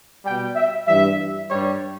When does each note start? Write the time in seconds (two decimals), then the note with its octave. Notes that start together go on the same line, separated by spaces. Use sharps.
0.24 B2 G3 G5
0.55 E5
0.87 G2 E3 G3 E5
1.49 G2 G3 C#5